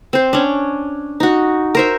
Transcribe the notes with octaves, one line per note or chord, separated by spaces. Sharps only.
C4 C5
C#4 D4
D#4 F#4
A#4 C5 E5